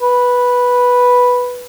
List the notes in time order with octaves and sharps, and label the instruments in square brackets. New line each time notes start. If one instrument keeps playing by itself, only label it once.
[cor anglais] B4